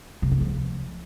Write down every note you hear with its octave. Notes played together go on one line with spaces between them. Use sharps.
C3
A3
F3